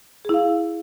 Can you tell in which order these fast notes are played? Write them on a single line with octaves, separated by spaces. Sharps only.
G#4 E4 F5